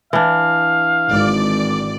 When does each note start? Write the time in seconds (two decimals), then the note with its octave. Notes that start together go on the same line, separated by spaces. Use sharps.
0.13 E3 D4 F5
1.10 G#1 D5